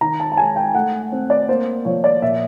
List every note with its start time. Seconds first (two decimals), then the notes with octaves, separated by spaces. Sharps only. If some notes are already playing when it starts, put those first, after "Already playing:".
0.01 D#3 A#5
0.20 A5
0.32 A5
0.37 G#3 G#5
0.56 G5
0.74 A3 F#5
1.12 C4
1.30 D5
1.49 A#3 C5
1.85 F3 C#5
2.04 D5
2.22 A#2 E5